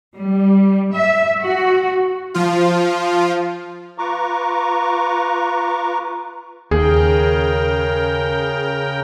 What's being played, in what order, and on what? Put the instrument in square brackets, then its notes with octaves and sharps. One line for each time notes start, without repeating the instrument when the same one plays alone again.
[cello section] G3
E5
F#4
[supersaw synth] F3 F4
[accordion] F4 B4 A#5 C#6 D6
[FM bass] D#2 [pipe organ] C#3 A#4 G5 [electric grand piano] G#4